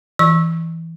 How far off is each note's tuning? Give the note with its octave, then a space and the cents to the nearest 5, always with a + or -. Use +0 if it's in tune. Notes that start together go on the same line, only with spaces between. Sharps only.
E3 +0 C#6 -25